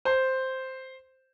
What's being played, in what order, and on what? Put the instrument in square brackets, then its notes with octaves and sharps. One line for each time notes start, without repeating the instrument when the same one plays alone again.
[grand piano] C5